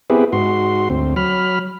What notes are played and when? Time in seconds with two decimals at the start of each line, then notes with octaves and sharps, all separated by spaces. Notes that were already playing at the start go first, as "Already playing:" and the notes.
0.10 B3 C4 E4 G4 G#4 B4
0.33 G#2 F#4 C6
0.90 D2 C4
1.16 F#3 B5 F6